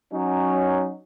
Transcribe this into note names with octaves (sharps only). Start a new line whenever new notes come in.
F#3 C#4 D#4